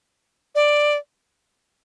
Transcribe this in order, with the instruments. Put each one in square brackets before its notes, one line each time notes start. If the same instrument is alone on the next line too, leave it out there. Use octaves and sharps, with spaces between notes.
[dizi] D5